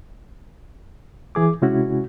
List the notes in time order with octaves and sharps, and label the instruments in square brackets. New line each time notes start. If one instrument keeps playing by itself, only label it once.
[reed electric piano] E3 G#4 D6
C3 G#3 C#4 E4 F#4